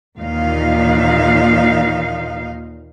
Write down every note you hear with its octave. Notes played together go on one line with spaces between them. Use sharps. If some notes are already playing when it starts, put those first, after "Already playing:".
D#2 A#2 E3 D#4 F5